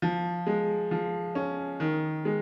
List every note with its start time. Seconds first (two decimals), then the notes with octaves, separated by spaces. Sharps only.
0.02 F3
0.47 G#3
0.91 F3
1.35 C#4
1.80 D#3
2.25 G#3